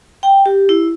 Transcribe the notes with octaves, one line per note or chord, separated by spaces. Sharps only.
G5
G4
E4